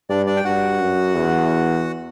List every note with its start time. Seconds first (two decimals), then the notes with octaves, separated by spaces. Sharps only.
0.09 G2 D4 D5
0.27 D4 D5
0.37 G5
0.44 G2 F#4 F#5
0.80 F#2
1.15 E2